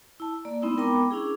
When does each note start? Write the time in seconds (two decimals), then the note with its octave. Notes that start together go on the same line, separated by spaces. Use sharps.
0.20 E4 A5
0.45 A#3 D5
0.62 G#3 B3 C4 D#4 E4
0.77 B3 A#4 G5 A#5 B5 D6
1.11 C#4 D4 E4 G#4